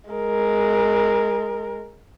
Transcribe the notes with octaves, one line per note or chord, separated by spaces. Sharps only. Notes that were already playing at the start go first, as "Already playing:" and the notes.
G#3 A#4